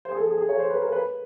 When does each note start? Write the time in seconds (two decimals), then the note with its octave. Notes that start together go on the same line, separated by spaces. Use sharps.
0.05 C5
0.11 G#4
0.16 A4
0.27 G#4
0.37 G#4
0.49 C#5
0.59 C5
0.70 B4
0.82 A#4
0.92 B4